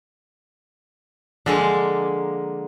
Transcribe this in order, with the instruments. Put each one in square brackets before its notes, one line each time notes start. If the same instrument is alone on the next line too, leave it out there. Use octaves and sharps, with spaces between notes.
[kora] D3 [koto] F3 G#3 A#3